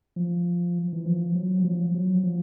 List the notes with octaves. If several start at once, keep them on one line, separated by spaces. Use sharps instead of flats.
F3
E3
F3
F#3
F#3
F3
F#3
F3